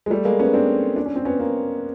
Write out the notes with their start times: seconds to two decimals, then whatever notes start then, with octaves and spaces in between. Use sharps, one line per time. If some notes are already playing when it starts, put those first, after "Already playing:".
0.06 G#3
0.10 G3 A3
0.25 G#3 A#3
0.39 B3 C#4
0.53 C4 D4
0.96 D4
1.06 C#4
1.16 C4
1.25 B3 C#4
1.39 A#3 C4